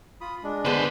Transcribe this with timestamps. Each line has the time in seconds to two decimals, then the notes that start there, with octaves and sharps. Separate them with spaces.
0.21 F4 B5 D#6
0.44 G#3 D4
0.65 D3 B3 G#4 B4 C5